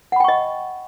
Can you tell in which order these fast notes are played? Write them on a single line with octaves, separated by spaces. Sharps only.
F#5 B5 G5 C#6 D#5